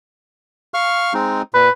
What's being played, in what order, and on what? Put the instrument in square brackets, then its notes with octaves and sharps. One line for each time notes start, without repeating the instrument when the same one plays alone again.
[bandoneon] F5 C#6 F6
G#3 C4 D#4
[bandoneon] A#2 [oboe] B4